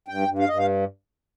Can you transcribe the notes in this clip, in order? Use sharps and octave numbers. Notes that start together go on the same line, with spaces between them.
G2 G5
G2
F5
G2 D#5
F5